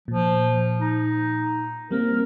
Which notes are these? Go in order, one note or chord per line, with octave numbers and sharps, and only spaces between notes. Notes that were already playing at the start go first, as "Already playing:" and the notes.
A#2 F3
D#4
G3 A#3 C4 A#4